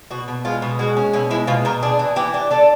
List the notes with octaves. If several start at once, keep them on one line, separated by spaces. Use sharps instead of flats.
B2 F#4
B2
G#3 F4
B2
G#3 F#4
C#4
B2 E4
G#3 E4
B2 F4
B2 A#4
D4 G#4
E3
E3 G4
D4
D4 A4